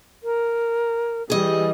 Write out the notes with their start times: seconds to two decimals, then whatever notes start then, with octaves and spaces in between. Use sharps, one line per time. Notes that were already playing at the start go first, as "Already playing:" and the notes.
0.24 A#4
1.30 E3 G3 G#4 D#5